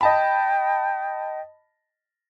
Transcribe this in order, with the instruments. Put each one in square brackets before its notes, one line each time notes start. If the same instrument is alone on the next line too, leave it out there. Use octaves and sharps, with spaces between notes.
[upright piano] D#5 A5 B5 [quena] G5